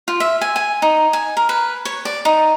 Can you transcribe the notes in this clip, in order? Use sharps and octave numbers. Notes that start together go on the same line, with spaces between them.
F4
E5
G#5
G#5
D#4
G#5
A#4
B4
C#5
D5
D#4